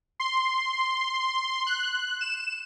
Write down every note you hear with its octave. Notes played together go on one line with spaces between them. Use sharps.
C6
F#6
E7